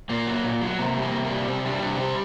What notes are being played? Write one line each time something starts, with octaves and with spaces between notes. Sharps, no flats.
A#2 A#3
F#3
A#2
F#3
C3 A#3
G3
A#3
C3
A#3
G3
C3 C4
G3 D4
C3 D4
G3 C4